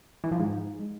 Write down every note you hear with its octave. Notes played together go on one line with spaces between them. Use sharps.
E3
F3
G#2